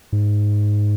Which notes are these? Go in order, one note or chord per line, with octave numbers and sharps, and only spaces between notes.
G#2